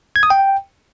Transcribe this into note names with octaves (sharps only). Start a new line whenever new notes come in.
G#6
D#6
G5